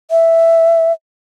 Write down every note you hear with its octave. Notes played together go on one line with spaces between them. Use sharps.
E5